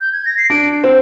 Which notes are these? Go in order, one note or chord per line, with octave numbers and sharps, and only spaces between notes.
G6
G#6
A#6
C7
D4 D7
C4